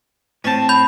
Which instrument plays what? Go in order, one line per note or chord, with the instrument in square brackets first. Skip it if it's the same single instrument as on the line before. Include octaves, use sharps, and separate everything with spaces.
[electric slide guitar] A2 C4 [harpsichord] C#4 A5
[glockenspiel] B5 G6 F7